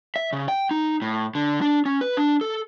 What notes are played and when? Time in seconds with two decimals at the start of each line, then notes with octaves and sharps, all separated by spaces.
0.16 E5
0.33 C#3
0.48 G5
0.71 D#4
1.02 A2
1.35 D3
1.61 D4
1.86 C#4
2.01 B4
2.17 D4
2.41 A4